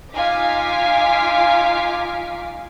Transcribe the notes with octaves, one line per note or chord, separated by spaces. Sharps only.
D#4 F4 F5 G#5 D6 B6